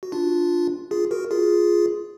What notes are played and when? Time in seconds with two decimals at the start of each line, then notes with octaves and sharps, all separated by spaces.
0.03 F#4
0.12 D4 F4
0.91 F4 G#4
1.11 F#4 A#4
1.31 F4 G#4